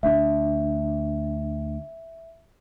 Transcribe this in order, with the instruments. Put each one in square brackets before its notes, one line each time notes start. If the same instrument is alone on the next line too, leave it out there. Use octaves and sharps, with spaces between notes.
[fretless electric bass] D2 D4 [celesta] E5